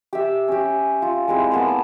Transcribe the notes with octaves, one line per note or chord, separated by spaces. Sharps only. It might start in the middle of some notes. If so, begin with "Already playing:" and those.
G4 E5
C#4 G4
F4
G#3 C4 E4
A#3 B3 A5